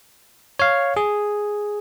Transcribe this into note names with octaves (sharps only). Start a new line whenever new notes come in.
C#5 F5
G#4